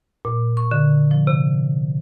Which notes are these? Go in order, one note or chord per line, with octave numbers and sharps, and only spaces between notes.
A#2
C#6
D3
F3
C3